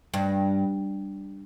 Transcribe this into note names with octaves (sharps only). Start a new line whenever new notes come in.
G2